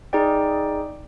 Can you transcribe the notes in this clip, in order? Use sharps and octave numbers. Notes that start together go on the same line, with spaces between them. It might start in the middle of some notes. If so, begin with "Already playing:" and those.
D#4 G#4 D5 G5